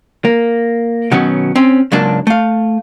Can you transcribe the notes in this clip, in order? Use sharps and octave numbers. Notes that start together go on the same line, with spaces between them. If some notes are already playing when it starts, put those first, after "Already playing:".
A#3
B2 D#3 F#3 B3 C#4
C4 C#4
C#2 G#2 F#3 A#3 D4 A5
A3 F5